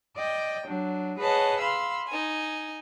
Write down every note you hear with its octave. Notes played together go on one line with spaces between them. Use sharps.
D5 D#5 G5
F#3 D4
G#4 B4 C#5 D#5 F#5 A5
F5 B5 C6 E6
D#4 G#5